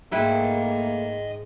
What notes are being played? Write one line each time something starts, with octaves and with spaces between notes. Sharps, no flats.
G#2 A3 A#3 E4 B4 D#5 G5